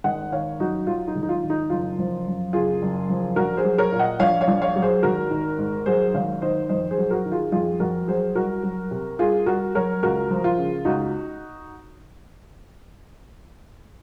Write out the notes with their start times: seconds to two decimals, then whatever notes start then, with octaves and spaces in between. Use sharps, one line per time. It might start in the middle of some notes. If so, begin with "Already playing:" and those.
0.04 G#1 D#5 F#5
0.32 D#3 C#5 F5
0.59 F#2 D#4 F#4
0.87 F#3 F4
1.08 D#4
1.16 G#1
1.23 D#4
1.29 F4
1.43 D#3
1.50 D#4
1.70 F#1 F4
1.99 F3
2.27 F#2
2.53 F#1 F4 G#4
2.82 F#1
3.10 F3
3.36 A#1 F#4 A#4
3.57 G#4 C5
3.64 F#3
3.78 A#4 C#5
3.92 A#2
3.99 D#5 F#5
4.19 A#1 C#5 F5
4.41 C#5 F5
4.48 A#1
4.62 C#5 F5
4.76 F#3
4.82 G#4 C5
5.03 G#1 F#4 A#4
5.31 D#3
5.58 G#2
5.86 F#3 G#4 C5
6.14 G#1 C#5 F5
6.42 D#3 C5 D#5
6.69 F2 C5 D#5
6.91 G#4 C5
6.98 F#3
7.11 F#4 A#4
7.26 D#3
7.32 F4 G#4
7.52 F2 F4 G#4
7.80 F2 F#4 A#4
8.08 F#3 G#4 C5
8.35 C2 F#4 A#4
8.63 F#3
8.91 C3
9.19 C2 F4 G#4
9.46 C2 F#4 A#4
9.75 F#3 A#4 C#5
10.03 C#2 F#4 A#4
10.31 F3
10.44 F4
10.58 C#3
10.85 C#2 D#4 F#4